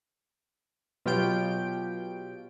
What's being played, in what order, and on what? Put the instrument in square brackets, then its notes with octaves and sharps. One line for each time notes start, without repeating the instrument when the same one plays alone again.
[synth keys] B2 F#3 F4 G4 G5 D7